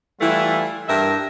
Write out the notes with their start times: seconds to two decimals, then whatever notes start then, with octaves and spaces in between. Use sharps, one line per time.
0.20 E3 G3 A3 E4 F4
0.87 G2 G3 A#4 E5